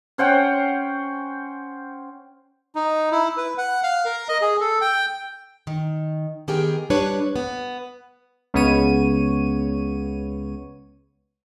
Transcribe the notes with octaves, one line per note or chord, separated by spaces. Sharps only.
C#4 C5 F#5 G5
D#4
E4
B4
F#5
F5
A#4
D#5
G#4
A4
G5
D#3
D#3 B3 G4 G#4 A#4 G5
G3 D4 B4 C#5
B3
C#2 C#3 B3 C#5 D#7